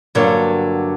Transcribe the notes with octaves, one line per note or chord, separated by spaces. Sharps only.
G2 D3 F#3 A#3